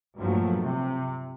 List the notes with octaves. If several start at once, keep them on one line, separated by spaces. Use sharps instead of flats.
G2 A#2 F3 F#3 A3
C3